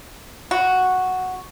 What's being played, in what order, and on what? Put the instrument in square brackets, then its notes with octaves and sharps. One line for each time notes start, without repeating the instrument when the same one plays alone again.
[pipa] F#4